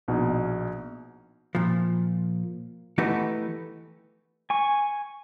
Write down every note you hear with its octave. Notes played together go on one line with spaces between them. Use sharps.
A#1 B2 D#4
A#2 F3
E3 A3 B3 D#4 G4 A4
G#5 C#6